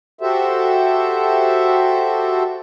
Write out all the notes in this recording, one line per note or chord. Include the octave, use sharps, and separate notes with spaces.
F#4 G4 A4 C5 E5